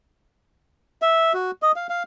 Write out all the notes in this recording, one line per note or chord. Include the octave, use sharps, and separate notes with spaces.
E5
F#4
D#5
F5
F5